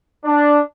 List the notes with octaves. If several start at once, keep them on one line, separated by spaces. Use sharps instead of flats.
D4